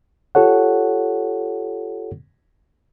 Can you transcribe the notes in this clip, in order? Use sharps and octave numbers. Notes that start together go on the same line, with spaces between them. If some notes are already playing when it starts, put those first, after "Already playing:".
F4 G4 A4 C#5 F#5